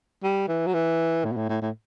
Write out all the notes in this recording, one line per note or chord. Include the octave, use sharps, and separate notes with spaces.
G3
E3
F#3
E3
A2
B2
A2
A2
A2